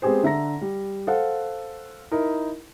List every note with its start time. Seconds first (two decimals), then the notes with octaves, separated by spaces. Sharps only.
0.02 G#3 B3 C4 G4 G#4 C5
0.23 D3 E5 A#5 A#6
0.61 G3
1.07 A4 C5 F5 F#5
2.12 D#4 E4 A#4